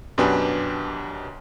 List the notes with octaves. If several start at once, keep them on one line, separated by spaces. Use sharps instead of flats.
F#2 B2 D4 G4 B4 G#5